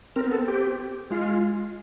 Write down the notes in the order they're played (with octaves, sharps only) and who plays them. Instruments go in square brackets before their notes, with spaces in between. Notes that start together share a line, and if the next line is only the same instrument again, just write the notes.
[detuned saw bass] C4 [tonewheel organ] A#4
[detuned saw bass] B3 [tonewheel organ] A4
[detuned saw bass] C4
[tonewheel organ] G4
[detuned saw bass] G#3 [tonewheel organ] F4